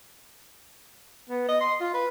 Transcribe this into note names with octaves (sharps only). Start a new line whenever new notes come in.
B3
D#5
C6
F4
B4